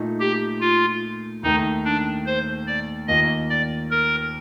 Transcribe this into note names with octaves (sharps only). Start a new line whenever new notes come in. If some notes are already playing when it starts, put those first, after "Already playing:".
Already playing: A#2 A3 D#4
G4
F4
D#2 D#3 A3 D#4
D4
C5
D5
D#2 D#3 A#3 F4 D#5
D5
A#4